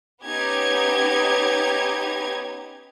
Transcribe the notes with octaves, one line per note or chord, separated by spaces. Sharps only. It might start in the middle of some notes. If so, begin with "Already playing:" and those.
B3 C#4 D#4 G4 G#6